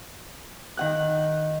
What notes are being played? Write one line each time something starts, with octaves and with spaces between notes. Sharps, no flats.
D#3 F#5 F#6